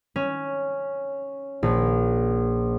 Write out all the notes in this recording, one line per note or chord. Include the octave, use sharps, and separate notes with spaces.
C#4
A#1